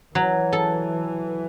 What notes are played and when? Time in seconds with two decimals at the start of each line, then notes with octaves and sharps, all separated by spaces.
0.15 E3 F#3
0.53 A4